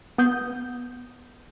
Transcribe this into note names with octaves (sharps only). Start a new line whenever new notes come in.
B3 D#6 G6